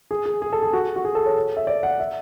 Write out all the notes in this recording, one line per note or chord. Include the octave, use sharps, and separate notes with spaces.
G#4
G#4
G#4
A4
G#4
F#4
F#4
G#4
A4
C#5
E5
D5
F#5
E5